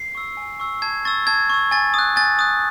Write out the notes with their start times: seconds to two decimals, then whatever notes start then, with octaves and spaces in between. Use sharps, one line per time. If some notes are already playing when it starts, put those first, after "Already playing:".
Already playing: C7
0.15 C#6 E6
0.37 G#5
0.60 C#6 E6
0.82 A5 G#6
1.05 C#6 E6 A6
1.27 A5 G#6
1.50 C#6 E6
1.71 G#5 A6
1.94 D#6 F#6
2.16 G#5 A6
2.39 D#6 F#6